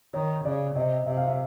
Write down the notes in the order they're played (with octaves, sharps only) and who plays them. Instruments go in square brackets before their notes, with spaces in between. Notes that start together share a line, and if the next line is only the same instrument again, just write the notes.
[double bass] D#3 [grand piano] C#5
[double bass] C#3 [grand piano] D5
[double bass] C3 [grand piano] D#5
[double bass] C3 [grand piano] E5
[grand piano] F5
E5